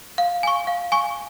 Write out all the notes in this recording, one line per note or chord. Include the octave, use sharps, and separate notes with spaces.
F5
G#5 C#6
F5
G#5 C#6